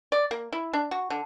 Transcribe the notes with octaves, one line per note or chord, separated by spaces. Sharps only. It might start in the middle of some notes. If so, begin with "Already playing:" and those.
D5
A#3
E4
D4
F#4
D3